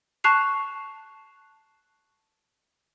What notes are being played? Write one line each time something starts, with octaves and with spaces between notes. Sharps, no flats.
A5 C#6 F#6 C7 F7